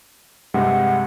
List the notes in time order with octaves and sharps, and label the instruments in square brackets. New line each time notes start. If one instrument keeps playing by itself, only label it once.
[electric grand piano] G2 C3 G#3 [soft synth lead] F#5